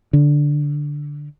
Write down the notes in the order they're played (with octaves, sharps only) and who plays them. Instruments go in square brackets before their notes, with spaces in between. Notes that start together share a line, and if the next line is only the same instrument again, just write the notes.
[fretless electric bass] D3